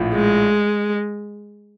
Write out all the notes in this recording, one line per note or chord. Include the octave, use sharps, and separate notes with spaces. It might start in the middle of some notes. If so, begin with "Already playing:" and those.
Already playing: A#1 A2 F3
G#3